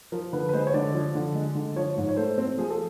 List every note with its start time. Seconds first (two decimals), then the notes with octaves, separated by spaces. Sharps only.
0.12 F3 A#4
0.33 D3 B4
0.49 B4
0.53 G#3 C5
0.67 C#5
0.74 D3 D5
0.94 F3
1.15 D3
1.35 G#3
1.55 D3
1.76 F3 C#5
1.97 G#2
2.09 C#5
2.17 A3 C5
2.38 C4
2.58 F3 G#4
2.70 A4